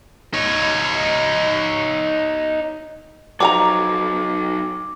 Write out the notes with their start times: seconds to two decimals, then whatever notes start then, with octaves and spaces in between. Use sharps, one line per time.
0.34 D#4 C#5
3.40 F3 F#3 D#4 F#5 A#5 D6